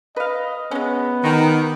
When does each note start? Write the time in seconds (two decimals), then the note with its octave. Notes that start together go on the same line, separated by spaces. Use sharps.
0.16 B4 D#5 F5
0.71 G#3 B3 C#4
1.24 D#3 D#4 G4 A#5